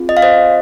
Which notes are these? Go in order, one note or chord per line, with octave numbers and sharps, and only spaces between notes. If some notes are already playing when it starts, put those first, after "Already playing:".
Already playing: C4 F4 G#4
D#5
F5
C5 D#5